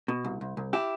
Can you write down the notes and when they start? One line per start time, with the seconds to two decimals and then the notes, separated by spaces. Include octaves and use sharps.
0.08 B2
0.25 C2
0.41 C2
0.57 C2
0.73 E4 G4